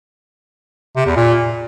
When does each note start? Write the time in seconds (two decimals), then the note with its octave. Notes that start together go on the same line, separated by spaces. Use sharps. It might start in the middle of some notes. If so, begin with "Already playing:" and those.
0.97 C3
1.07 E2
1.16 A#2